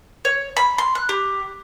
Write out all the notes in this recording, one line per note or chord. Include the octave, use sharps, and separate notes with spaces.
C#5
B5
C6
F#6
G4